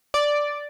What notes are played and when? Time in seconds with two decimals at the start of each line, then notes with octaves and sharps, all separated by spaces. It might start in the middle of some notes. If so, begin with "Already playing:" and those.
0.14 D5